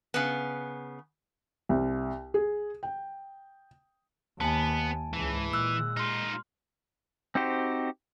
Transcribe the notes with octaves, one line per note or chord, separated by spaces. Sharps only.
C#3 B3
C2
G#4
G5
D#2 B3 G#5 A5
C#2 G#2 E3
A#2 G#3 E6 F#6
D#4 F4 C6 F6
C4 D#4 F#4 G4 C5